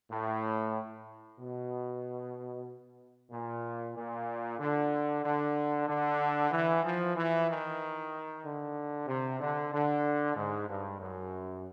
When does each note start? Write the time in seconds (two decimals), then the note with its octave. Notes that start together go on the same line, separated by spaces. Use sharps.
0.11 A2
1.39 B2
3.31 A#2
3.95 A#2
4.59 D3
5.23 D3
5.87 D3
6.51 E3
6.84 F3
7.15 E3
7.47 D#3
8.43 D3
9.07 C3
9.40 D3
9.72 D3
10.35 G#2
10.67 G2
10.99 F#2